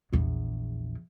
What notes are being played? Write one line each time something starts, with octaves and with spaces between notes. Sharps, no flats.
A#1 E2